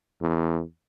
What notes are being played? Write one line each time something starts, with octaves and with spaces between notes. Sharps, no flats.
E2